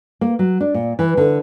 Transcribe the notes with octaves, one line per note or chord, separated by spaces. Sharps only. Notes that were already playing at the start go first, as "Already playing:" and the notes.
A#3
F#3
D4
A#2
E3
D3